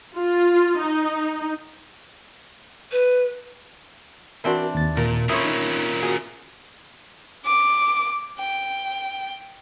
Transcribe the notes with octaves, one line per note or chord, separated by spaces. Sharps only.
F4
D#4
B4
E3 C4 D4 F#4 A#4
D#2 A6
A#2 A#4
C#4 E4 F4 A#4 C5 C#5 D#6
D#4
F#4 G#4 A#5
D6
G5